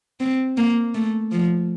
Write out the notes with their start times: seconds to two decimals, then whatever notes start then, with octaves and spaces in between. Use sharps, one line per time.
0.20 C4
0.57 A#3
0.94 A3
1.32 F3